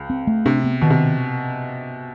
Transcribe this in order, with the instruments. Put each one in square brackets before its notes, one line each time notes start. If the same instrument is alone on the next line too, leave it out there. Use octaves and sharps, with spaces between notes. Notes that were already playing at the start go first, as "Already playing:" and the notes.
Already playing: [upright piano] C#2
[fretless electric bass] C4
A3
[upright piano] C3 [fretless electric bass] D4
[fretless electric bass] B3
[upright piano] B2 [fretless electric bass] D#3
[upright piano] C3